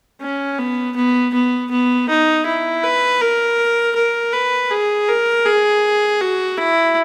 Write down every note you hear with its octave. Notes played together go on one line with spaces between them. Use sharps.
C#4
B3
B3
B3
B3
D#4
E4
B4
A#4
A#4
B4
G#4
A#4
G#4
F#4
E4